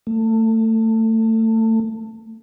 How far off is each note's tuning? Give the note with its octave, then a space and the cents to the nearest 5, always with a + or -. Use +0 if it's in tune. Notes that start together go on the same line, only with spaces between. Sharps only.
A3 +25